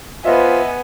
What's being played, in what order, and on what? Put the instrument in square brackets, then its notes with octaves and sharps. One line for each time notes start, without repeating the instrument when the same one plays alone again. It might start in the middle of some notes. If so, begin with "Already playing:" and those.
[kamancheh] B3 G#5 [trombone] F4 [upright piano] B4 D#5 E5 [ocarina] C5